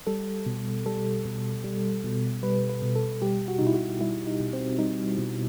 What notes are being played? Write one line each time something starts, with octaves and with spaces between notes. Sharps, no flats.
G3 A4
B2
G3 A4
B2
G3
B2
G3 B4
B4
B2
A4
G3 G4
F#4
D#4
B2
E4
F#4
G3 E4
D#4
B2
C4
G3 D#4
B2